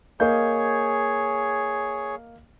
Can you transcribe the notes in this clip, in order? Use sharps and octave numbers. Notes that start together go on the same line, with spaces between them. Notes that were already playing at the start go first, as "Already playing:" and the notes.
A#3 G#4 C#5 D#5 G6